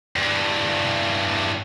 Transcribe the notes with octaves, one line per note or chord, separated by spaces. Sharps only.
E2 G2